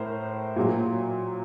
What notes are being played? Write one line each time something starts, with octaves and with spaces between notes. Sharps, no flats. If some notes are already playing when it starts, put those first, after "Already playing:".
Already playing: A2 A#4 C5
A#2 F#3